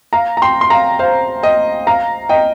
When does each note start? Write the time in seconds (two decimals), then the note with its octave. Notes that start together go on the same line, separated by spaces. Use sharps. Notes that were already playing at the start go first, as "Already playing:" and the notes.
0.13 F5 A#5
0.37 A#5
0.42 G5 C6
0.61 C6
0.70 F5 A#5
0.99 C5 F5
1.43 D#5 G5
1.87 F5 A#5
2.29 D#5 G5